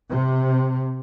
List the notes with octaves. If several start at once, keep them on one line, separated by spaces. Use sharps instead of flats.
C3